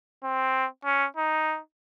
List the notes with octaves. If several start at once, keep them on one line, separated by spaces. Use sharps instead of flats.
C4
C#4
D#4